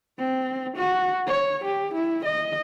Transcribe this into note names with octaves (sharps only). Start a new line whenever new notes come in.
C4
F#4
C#5
G4
E4
D#5